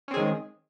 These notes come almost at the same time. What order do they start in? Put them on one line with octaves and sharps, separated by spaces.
C#4 C4 G#4 D#3 G#3